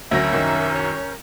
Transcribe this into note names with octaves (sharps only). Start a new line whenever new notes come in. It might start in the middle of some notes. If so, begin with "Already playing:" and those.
D2 F#3 C#4 A#4 E5 G6 A#6
C2 F#2 D#3
C#5